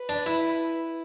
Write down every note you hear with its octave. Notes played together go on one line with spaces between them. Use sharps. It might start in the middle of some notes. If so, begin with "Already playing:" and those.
Already playing: B4
D4
E4